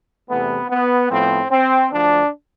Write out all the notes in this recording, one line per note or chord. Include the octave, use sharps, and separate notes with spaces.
E2 C3 E3 A3 B3
B3
A2 F3 B3 C4
C4
D2 D3 F3 D4